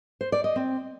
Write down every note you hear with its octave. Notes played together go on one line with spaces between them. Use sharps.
C5
D5
D#5
C4